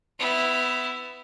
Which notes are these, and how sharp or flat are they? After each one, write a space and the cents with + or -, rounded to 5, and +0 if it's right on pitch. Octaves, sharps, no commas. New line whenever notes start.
B3 +25 E4 +0